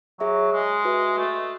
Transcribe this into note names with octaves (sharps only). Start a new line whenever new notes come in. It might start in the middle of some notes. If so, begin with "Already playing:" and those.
F#3 G#4 C#5 E5
G#3
F#4 B4 E5
A3